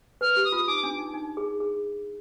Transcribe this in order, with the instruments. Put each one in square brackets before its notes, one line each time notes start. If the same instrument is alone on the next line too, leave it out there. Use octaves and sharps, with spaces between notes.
[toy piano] B4 [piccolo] F6
[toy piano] G4
[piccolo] D#6
[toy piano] F4
[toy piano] D#4 [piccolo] D6
[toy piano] D4
D#4
D#4
G#4
G#4